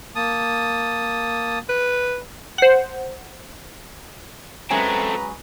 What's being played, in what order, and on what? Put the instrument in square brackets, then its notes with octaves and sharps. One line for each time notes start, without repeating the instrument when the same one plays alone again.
[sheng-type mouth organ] A#3 A5 D#6
[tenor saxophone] B4
[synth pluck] C5 F#5
[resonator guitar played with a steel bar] F#3 G#3 C#4 [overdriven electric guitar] A3 C4 [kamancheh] B4 A#5 [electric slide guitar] G#5